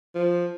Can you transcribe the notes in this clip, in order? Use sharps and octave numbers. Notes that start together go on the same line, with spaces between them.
F3